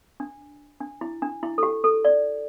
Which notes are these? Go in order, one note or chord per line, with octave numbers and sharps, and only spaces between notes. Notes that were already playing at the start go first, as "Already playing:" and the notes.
D4
D4
E4
D4
E4
A4
G4
A4
D5